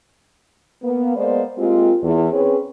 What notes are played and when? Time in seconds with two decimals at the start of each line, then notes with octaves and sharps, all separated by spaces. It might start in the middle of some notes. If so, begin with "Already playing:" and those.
0.83 A#3 B3
1.16 G#3 A#3 B3 C5 D5
1.58 G#3 A#3 C4 F4 G4
2.03 E2
2.33 C4 C#4 G#4 B4 C#5